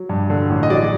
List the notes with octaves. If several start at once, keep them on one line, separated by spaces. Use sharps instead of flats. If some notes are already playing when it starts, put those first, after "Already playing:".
Already playing: F#3
G2
D3
A1
D#5
F#3 D5